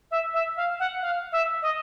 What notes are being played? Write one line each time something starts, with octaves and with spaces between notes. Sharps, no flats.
E5
E5
F5
F#5
F5
E5
D#5